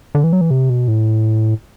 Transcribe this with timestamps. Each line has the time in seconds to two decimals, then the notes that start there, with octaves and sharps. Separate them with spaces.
0.15 D3
0.24 E3
0.33 F#3
0.41 E3
0.51 C3
0.70 B2
0.88 A2